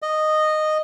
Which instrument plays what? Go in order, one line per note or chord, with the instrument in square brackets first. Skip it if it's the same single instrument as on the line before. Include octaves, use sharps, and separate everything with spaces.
[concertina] D#5